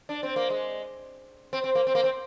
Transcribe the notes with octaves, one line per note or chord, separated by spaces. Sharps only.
D4
C4
A#3
G#3
C4
C4
A#3
C4
A#3
C4